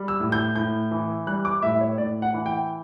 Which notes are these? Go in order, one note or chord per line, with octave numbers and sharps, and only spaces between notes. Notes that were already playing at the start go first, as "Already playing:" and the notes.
Already playing: G3
E6
A2
G6
A2 G6
E3
G3 F#6
D6
A2 E5
C#5
A2 D5
F#5
E3
G5